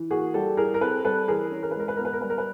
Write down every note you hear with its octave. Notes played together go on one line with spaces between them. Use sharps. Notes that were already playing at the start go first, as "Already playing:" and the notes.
Already playing: E3
A#3 F#4 G#4
G3 G4 A4
E4 G#4 A#4
A#4
C4 A4 B4
G3 A4 B4
E3 G#4 A#4
C#4
A#4
B4
G#3 A#4
B4
B3 A#4
B4
A#4
G3 B4
A#4
B4